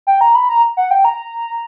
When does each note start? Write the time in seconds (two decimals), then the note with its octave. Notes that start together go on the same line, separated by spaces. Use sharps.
0.07 G5
0.21 A#5
0.35 B5
0.49 A#5
0.77 F#5
0.91 G5
1.05 A#5